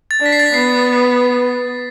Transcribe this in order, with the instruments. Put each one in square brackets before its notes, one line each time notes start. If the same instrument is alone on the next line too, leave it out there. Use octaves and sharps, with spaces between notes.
[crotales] A6
[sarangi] D4 [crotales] B6
[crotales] C7
A6
B6
[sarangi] B3 [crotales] C7